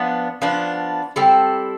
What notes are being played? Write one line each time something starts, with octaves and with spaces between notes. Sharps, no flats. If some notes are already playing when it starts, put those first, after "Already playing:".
Already playing: F3 B3 D4
F3 B3 D4
G3 C4 E4 A4